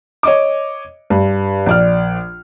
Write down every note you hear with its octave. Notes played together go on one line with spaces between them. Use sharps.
C#5 D#5 D6
G2
A#1 D5 F6